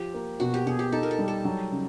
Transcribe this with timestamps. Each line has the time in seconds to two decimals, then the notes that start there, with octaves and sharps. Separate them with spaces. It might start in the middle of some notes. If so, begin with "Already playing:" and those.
Already playing: F3 F4 G4
0.14 A#3
0.40 B2 F#4
0.54 G4
0.66 B2 G#4
0.79 G4
0.92 D#4 A4
1.03 A#4
1.11 A4
1.19 G3
1.28 A4
1.45 F#3
1.72 C#3